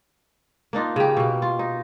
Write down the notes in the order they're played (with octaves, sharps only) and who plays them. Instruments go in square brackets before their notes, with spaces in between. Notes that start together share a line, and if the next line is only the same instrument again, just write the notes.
[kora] A#3 D4 D#4 F4
C#3 G4
B2 A#3
F4
D#4